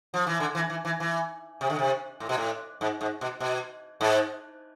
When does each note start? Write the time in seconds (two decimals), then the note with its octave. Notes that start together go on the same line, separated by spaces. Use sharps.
0.14 F3
0.27 E3
0.40 D3
0.55 E3
0.70 E3
0.85 E3
1.00 E3
1.61 C3
1.70 D3
1.79 C3
2.20 A2
2.29 B2
2.37 A2
2.81 G#2
3.01 G#2
3.21 B2
3.40 B2
4.01 G#2